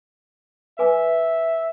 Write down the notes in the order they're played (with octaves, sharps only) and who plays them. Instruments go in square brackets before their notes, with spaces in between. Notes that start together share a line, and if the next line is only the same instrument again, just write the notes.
[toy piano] B4 G#5 D6 [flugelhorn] E5